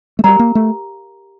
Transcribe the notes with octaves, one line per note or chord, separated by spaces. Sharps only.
A3
G3 G4 A#4 F5 A#5
A#3
A3